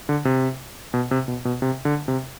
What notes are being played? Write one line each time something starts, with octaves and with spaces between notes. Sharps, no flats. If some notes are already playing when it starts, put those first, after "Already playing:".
D3
C3
B2
C3
B2
B2
C3
D3
C3